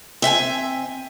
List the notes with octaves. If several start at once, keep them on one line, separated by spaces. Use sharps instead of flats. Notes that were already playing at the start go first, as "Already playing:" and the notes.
C4 E5 F#5 G#5